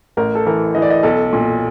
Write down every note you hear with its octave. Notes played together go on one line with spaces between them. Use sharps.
A1 A#4
A4
E3 A#4
E3 D#5
D5
D#5
B1 A4
A#2